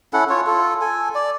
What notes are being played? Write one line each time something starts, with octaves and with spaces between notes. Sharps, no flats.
C#4 E4 A4 F#5
F4 C#5
F4 A4
A4 G#5
D5